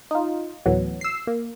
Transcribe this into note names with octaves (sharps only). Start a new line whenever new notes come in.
D#4 F4
D2 A2 E3 F#3 B3
E6 C7
A#3